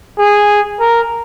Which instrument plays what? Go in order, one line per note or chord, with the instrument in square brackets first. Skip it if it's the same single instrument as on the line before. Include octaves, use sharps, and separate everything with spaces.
[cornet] G#4
A#4